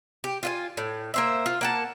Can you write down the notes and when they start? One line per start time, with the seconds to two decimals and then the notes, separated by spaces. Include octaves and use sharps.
0.24 G4
0.43 F4 F#4 G#5
0.77 A2
1.14 A#3 C5 E5
1.46 F4
1.61 A#3 F#5 A5